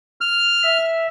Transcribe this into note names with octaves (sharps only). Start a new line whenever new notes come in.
F6
E5